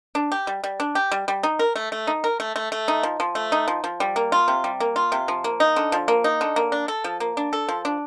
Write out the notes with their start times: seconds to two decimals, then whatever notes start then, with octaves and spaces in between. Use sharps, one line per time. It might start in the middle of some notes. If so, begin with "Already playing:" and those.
0.15 D4
0.32 G4
0.47 G3
0.64 G3
0.80 D4
0.95 G4
1.12 G3
1.28 G3
1.43 D#4
1.59 A#4
1.76 A3
1.92 A3
2.07 D#4
2.24 A#4
2.40 A3
2.56 A3
2.72 A3
2.88 D#4
3.03 F3
3.20 F3
3.35 A3
3.52 D#4
3.68 F3
3.84 F3
4.00 G3
4.16 A#3
4.32 F4
4.48 C3
4.64 G3
4.80 A#3
4.96 F4
5.12 C3
5.28 F3
5.44 A#3
5.60 D#4
5.76 D3
5.92 F3
6.08 A#3
6.24 D#4
6.41 D3
6.56 A#3
6.72 D4
6.88 A4
7.04 F3
7.20 A#3
7.37 D4
7.53 A4
7.69 F3
7.85 D4